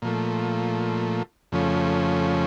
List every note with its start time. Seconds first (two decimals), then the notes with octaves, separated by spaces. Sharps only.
0.02 A#2 F3 A3
1.52 F2 C#3 F3 A3 C#4